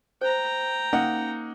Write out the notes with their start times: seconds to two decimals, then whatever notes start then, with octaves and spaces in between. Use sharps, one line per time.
0.21 C5 G5 A#5
0.93 A#3 C#4 D#4 F#5